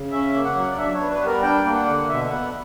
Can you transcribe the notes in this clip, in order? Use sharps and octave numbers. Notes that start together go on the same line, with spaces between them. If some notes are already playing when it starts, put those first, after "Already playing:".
Already playing: C#3
C#4 E5
A#3
F#5
F#3
D5
D4 E5
C#5
B3
B4
G3
A#4
D4 G5
A#3
F#5
D3
B2 E5
E5
B3 F#5